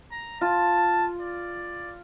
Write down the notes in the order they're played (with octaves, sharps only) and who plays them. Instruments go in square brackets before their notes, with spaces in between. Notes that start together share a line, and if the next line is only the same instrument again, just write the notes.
[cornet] A#5
[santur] F4 [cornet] A5
[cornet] D5